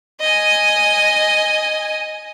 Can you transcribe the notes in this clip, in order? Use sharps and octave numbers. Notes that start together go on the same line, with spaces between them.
D#5 G#5